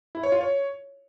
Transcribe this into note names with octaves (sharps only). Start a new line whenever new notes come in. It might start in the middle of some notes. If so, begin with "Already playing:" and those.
E4
C#5
F4
C#5